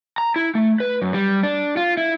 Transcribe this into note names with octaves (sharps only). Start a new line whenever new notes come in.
A#5
E4
A3
B4
F#2
G3
D4
F4
E4